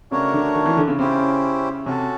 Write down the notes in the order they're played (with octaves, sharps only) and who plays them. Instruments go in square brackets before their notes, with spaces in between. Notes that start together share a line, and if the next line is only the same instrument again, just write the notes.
[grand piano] C#3 [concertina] A3 D4 F#4 A#4 C#5
[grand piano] D3
D#3
E3
D3
C#3
[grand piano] C#3 [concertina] C#4 E4 G4 C5
[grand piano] C3 [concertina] C#4 F#4 A4